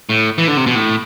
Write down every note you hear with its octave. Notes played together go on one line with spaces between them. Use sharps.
A2
E3
D3
C3
B2
A2